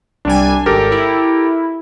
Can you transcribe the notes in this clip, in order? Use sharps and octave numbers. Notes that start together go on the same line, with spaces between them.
C2 G3 D4 G#5
G#1 G4 A4 A#4
E4